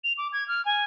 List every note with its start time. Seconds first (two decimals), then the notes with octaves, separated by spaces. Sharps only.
0.04 F7
0.18 D6
0.33 G#6
0.48 F6
0.65 G#5